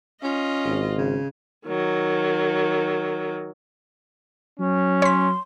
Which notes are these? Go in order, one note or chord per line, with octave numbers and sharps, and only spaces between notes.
C#4 F4 D#5
G#1
C#3
D#3 F#3
F#3 C#4
C#5 C6 B6